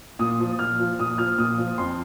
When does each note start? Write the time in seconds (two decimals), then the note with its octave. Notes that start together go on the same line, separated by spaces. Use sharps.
0.19 A#2 D#6
0.40 F3
0.59 A#2 F6
0.80 F3
0.99 A#2 D#6
1.18 F3 F6
1.38 A#2 D#6
1.58 F3
1.78 F2 C6